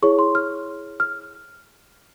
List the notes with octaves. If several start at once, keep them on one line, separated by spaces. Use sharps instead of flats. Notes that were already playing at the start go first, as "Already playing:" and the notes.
E4 G#4 C#5 C#6
C6
F6
F6